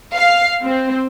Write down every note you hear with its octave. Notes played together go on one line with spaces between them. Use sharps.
F5
C4